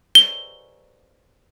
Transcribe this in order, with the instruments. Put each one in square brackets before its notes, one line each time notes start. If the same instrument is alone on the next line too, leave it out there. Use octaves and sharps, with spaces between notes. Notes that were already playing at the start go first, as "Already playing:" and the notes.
[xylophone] G7